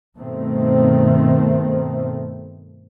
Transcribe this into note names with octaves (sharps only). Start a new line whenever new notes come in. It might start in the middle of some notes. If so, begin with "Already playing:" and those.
G2 B2 D#3 A3 C4